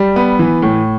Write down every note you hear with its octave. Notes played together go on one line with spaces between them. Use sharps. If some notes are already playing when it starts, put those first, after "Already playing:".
Already playing: G3
B3
E3
A2